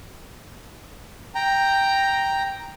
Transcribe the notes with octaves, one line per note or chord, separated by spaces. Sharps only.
G5 A#5